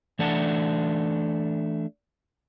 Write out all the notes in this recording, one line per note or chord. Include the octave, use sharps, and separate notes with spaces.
E3 A3 D4 F#5 A5